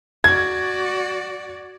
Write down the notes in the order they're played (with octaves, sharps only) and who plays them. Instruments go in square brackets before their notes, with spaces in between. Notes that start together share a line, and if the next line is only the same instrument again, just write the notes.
[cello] F#4 D5 [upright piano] G#6